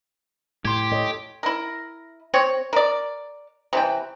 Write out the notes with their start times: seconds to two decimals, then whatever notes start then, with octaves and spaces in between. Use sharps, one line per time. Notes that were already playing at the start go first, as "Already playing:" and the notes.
0.65 A2 A3 G4 C6 G#6
0.92 A4 C#5 D#5
1.43 E4 A#4
2.34 C4 C#5
2.73 A#4 D5
3.73 C3 E3 G5